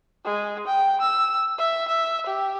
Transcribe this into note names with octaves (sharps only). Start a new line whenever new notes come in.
G#3
G5
E6
E5
E5
G4